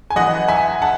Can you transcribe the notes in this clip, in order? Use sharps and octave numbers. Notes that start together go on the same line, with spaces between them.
G#5
F#2 E3 D#5 F#5
E5 G#5
F#5 A5